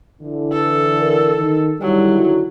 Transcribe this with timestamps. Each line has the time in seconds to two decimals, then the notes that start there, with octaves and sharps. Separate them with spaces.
0.22 D3 E3
0.52 A4
1.01 A#4
1.38 D#3
1.82 D3 D#3 F#3 G3 E4
2.19 F#4